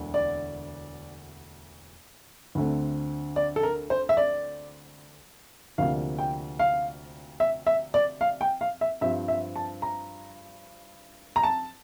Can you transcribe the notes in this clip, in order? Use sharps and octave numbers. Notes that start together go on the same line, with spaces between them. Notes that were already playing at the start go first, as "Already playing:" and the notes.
Already playing: E1 D2 D3
D5
D2 D3 A3 C4
D5
A4
A#4
C5
E5
D5
D2 C3 F3 A#3 D4 F5
G5
F5
E5
E5
D5
F5
G5
F5
E5
G2 F3 C4 E5
E5
A5
A#5
A#5
A5